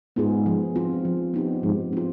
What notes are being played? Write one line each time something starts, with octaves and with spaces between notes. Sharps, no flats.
G#2 B3 F4 G#4
F3
C4 F4
F3
B3 D#4 G4
G#2 F3
C4 F4